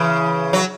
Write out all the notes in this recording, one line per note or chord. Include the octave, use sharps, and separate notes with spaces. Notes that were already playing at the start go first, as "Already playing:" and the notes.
Already playing: C#3 E3
F#3